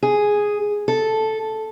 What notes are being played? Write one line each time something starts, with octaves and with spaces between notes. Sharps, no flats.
G#4
A4